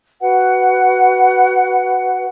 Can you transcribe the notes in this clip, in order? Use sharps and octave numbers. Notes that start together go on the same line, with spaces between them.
F#4 B4 F#5